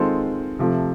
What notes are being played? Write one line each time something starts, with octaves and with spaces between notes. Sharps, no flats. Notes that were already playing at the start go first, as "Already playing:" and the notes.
Already playing: D#3 G#3 C4 F4 A4
C3 F3 A3